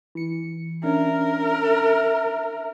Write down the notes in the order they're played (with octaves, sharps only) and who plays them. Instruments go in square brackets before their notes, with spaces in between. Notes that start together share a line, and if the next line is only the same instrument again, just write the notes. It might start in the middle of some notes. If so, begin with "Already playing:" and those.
[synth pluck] E3 C#7
[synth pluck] C#4 D4 [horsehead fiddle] A#4 [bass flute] E5